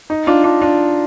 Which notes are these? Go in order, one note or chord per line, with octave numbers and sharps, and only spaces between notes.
D#4
D4 F4
D4 F4
D4 F4